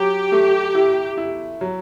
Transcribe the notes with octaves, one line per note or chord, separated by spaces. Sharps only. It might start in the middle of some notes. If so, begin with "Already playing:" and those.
Already playing: F#3 G4
A3
E4
E4
F#3